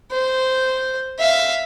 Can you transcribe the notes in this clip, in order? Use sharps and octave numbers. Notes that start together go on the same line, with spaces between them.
C5
E5 F5